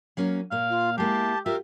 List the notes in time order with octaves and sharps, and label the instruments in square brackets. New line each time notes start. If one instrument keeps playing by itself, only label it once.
[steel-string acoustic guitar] F#3 A#3 C#4
[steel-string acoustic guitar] A#2 A#3 [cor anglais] F5
[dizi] F4
[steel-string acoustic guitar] G#3 A#3 E4 [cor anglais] G4 [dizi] A5
[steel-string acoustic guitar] F4 G4 [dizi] A#4 [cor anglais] E5